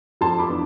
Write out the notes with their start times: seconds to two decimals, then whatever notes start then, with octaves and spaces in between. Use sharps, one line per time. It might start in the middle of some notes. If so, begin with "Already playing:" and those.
0.21 F2 A5 C6
0.38 B5 D6
0.48 E3 B3 D4